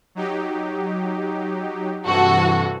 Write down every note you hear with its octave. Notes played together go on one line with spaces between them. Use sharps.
F#3 D#4 G4
G2 C3 E3 F#4 A4